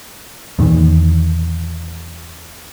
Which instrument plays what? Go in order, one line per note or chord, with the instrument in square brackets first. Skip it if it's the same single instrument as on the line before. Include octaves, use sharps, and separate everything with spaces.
[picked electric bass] E2 A#2 D#3